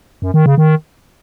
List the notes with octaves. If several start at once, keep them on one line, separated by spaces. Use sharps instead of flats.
F#2
D#3
C#3
D#3